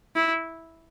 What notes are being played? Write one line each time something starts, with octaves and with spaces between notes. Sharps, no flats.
E4